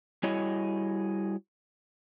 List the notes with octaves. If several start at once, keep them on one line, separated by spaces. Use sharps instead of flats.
G3 E4 F#4 G#4 C#5 D#5